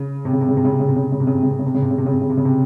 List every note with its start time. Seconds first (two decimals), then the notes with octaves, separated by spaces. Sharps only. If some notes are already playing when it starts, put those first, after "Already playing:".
Already playing: C#3
0.25 C3
0.33 C#3
0.41 C3
0.49 C#3
0.57 C3
0.65 C#3
0.72 C3
0.80 C#3
0.88 C3
0.96 C#3
1.04 C3
1.12 C#3
1.20 C3
1.27 C#3
1.35 C3
1.43 C#3
1.51 C3
1.59 C#3
1.66 C3
1.74 C#3
1.82 C3
1.91 C#3
1.98 C3
2.06 C#3
2.14 C3
2.22 C#3
2.30 C3
2.37 C#3
2.45 C3